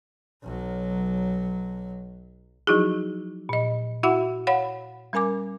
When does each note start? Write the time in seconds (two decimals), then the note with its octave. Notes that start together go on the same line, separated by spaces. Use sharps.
0.42 B1 F#3
2.67 F3 F#3 D#4 E4 F#4 G#4
3.49 A#2 D#5
4.03 E4 F#4 E5 F#5 B5
4.47 C#5 F5 F#5 B5
5.13 G3 C#4 A#4 G#5 D6